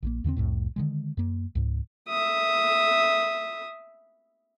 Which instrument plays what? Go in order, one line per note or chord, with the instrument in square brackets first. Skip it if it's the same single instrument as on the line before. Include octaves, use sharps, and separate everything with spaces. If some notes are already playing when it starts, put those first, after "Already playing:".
[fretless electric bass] A#1 C#3 A#3
E2 D3 A#3 C4
C2 F2 A2
D3 D#3 G#3
F#2 A#3
C#2 G#2
[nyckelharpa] E5 D#6